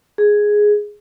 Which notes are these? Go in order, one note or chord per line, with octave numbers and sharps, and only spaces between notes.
G#4